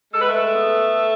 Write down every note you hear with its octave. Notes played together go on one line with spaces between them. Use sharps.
G#3 A4
B4
A3 A4
B3